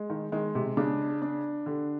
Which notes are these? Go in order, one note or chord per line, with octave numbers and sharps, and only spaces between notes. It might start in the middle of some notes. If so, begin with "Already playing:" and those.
Already playing: G#3
D#3
D#3 G#3
C3
C#3 D4
D4
D3 G4